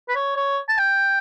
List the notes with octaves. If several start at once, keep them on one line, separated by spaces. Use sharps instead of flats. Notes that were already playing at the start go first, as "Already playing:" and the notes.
B4
C#5
C#5
A5
G5